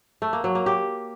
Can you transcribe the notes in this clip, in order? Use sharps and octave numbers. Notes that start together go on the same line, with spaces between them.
A3
A#3
F#3
A#3
G4